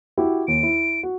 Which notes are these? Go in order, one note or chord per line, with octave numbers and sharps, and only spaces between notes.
E4 F#4 G4
D#2 D7
E4
F#4